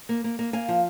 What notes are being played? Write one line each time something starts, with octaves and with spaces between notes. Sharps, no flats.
A#3
A#3
A#3
A#3 F5 G#5
F3